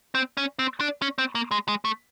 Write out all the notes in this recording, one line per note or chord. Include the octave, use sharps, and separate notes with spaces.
C4
C#4
C4
D4
C#4
C4
A#3
G#3
G#3
A3